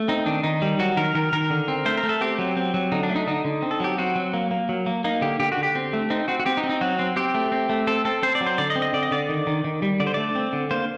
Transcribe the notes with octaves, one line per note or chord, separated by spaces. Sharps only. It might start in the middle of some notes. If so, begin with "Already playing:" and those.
Already playing: A3
C4 D#4
D#3 D4
D#3 D#4
G3
F#3 F#4
D#3 A#4
D#3 A#4
D#3 A#4
D3
C4
A3 C5
A#4
A3
A4
C4 G4
F#3
C4
F#3
D3 D#4
D4
A3
D#4
D3 D#4
D3
C4
A4
F#3 G4
C4 F#4
F#3
A#3
A#3
F#3
A#3
A#3 D#4
D3 G4
D3 G4
F#4
D3
G4
C4
A3
C4 D#4
C4 F#4
F#4
C4 G4
D#4
C4
D#4
F#3 F#4
C4
C4 G4
A3
C4
A3
C4 A4
C4 A4
C4 C5
D5
F#3
C5
D3 D5
D#5
C4
D#5
D3 D5
D#5
D3 D5
D#3
D#3
D#3
G3
D3 D5
C5
A3 D5
C4
D3
A#3 C5